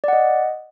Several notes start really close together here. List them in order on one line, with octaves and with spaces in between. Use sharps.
D5 F#5 D#5